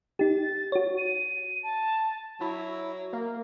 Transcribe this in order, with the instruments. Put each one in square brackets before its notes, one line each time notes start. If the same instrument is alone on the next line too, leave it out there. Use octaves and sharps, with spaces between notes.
[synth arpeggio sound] D#4 G4 [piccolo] A6
[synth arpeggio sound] F#4 C#5
[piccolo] D#7
A5
[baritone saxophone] F#3 [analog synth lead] E4
[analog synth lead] A#3